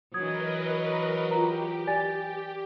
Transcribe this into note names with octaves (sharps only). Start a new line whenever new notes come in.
E3 F#3 A#4 B4 D#5 D#6 G#6
F4 G4 A#5
D5 G#5 A6